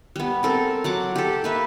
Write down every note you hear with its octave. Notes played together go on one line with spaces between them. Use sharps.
G3 B3
C4 A4 A#4
F#3 F#5 D6
G4 A4
A#3 B4 E5